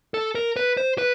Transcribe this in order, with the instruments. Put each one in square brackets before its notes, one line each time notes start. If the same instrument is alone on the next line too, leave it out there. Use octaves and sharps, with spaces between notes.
[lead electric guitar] A4
A#4
B4
C5
B4